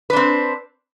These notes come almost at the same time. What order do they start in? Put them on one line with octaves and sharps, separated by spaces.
B4 D4 C4